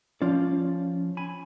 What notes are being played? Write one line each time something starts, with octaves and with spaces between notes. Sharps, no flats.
F3 C#4 F4 D5
G#5 B5